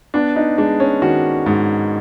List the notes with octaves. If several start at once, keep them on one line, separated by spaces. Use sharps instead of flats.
B3 D4
D#4
G#3 D4
C#4
D#3 F#4
G#2